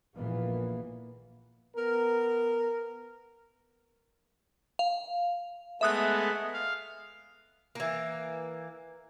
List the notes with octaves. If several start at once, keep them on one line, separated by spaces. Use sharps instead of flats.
A#1 E3 A#3 B3
B3 A#4
F5
G#3 A3 B3 E5 D#6 F#6
F5
E3 A#3